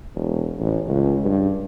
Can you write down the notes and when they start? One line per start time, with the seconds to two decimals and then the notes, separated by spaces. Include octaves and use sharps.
0.15 E1
0.59 A1
0.88 C#2
1.25 G2